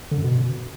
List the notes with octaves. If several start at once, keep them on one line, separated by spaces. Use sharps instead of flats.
D3
F#2
B2